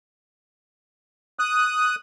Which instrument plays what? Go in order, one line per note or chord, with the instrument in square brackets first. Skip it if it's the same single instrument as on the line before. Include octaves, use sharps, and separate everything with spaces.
[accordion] D#6 F#6